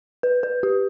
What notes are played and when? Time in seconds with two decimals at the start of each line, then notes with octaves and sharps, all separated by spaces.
0.23 B4
0.43 B4
0.63 G4